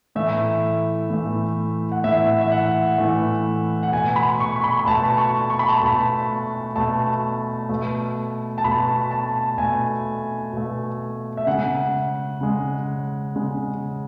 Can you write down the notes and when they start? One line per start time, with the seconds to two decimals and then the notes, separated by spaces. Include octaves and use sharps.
0.15 A2 E3 A3 E5
1.10 A2 E3 A3
1.92 F#5
2.04 A2 E3 A3 E5
2.41 E5
2.52 F#5
2.98 A2 E3 A3
3.83 F#5
3.92 B2 A3 G#5
4.16 B5
4.40 C#6
4.56 C#6
4.64 B5
4.79 B5
4.86 B2 A3 A5
5.18 C#6
5.50 C#6
5.59 B5
5.69 A5
5.78 B2 A3 B5
6.76 B2 A3 A5
7.69 B2 A3
8.58 A5
8.64 B2 A3 B5
9.11 A5
9.58 B2 A3 G#5
10.53 B2 A3
11.37 E5
11.47 C#3 G#3 F#5
12.41 C#3 G#3
13.36 C#3 G#3